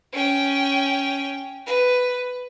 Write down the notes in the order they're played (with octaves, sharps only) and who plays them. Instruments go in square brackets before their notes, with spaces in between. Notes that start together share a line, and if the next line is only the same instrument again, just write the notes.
[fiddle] C#4 G5
B4